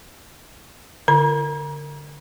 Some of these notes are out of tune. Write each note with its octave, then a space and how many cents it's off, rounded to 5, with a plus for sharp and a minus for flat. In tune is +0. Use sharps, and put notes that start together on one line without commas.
D3 -20 B5 +0